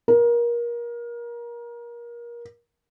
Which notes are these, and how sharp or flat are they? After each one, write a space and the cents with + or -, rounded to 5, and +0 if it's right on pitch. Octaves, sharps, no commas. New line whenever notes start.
A#4 +25